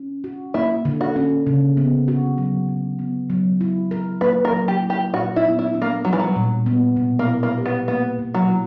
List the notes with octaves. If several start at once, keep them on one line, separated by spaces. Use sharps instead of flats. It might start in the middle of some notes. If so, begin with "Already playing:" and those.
Already playing: C#4
F#4
A#3 E4
D3
F#4
C#4
C#3
B3
F#4
F#3
C#3
B3
F#3
E4
A#4
A#3 B4
A#4
F#3
G4
E4
G4
A#2 F#4
E4
B3
E4
D4
A#3
F#3 G3
E3
F#3
A#2
B3
B2
A#3
E4
A#3
G4
B3
A#3 B3
B2
F#3
E4